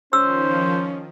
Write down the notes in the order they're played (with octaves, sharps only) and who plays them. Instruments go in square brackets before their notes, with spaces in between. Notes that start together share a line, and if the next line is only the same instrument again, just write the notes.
[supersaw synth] D#3 F3 [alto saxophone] C#4 [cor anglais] C5 [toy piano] E6